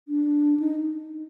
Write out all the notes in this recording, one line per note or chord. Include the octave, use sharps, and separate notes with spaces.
D4
D#4